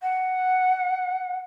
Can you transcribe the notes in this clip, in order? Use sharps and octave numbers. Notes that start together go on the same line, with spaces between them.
F#5